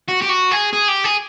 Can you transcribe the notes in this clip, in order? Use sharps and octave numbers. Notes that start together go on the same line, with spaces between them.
F#4
G4
F#4
G#4
G#4
G4
G#4